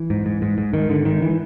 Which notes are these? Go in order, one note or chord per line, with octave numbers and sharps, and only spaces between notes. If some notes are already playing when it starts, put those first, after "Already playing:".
Already playing: E3
G#2
G#2
G#2
G#2
G#2 D#3
G#2 D3
G#2 D#3
E3